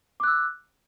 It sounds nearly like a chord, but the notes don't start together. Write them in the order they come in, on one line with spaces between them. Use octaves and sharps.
D6 F#6 E6